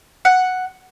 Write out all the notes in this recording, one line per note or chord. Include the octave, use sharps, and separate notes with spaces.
F#5